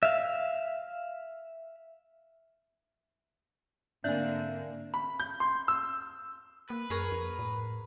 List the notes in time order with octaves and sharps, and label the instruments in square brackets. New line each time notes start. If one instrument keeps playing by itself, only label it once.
[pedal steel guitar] E5 F5
[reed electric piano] G#2 C4 G6 [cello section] D3 A#3 [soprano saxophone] D4 [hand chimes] E5 G#5
[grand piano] B5
G6
C6
E6
[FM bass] A#3 [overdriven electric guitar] B4
[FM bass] F#2 [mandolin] G#4 A#4 C#5
[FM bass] F2
A2